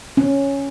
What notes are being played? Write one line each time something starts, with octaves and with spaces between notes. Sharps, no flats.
C#4